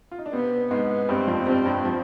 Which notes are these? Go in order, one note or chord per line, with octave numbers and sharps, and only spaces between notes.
F4
D#4
D4
C3 B3 C4
G#2 G#3 B3
G2 G3 C4
F2 F3
G2 G3 C4
G2 G3
F3